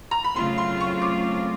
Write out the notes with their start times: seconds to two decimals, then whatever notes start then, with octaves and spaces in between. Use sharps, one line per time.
0.11 A#5
0.24 B5
0.36 C#3 F#3 A3 C4 F4 C6
0.58 C6
0.80 C#6
1.02 D6